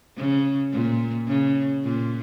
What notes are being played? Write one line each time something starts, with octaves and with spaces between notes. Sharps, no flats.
C#3
A#2
C#3
A#2